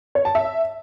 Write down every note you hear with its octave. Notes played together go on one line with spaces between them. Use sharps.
C#5
A5
E5